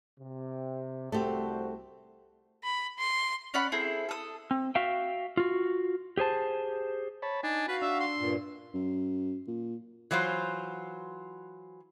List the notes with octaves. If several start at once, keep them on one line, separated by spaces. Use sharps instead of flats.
C3
C2 A3 C4 F#4 G4 C5
B5
C6
C#4 D5 F#5 B5
C4 E4 G#4 A4
A4 D#6
C4
F#4 E5 F5 G5
F4 F#4
G4 G#4 C5 A5
C#5 A5 B5
D4 D#4 G#5
F#4 B4 F5
D4 E5
C6
G2 A#2
F#2
A#2
E3 F#3 F4 C5